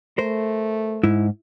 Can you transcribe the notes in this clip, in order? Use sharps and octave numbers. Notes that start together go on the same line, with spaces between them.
A3 A#4 C5
G#2 E4